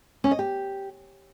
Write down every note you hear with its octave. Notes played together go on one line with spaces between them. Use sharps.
C#4
D#5
G4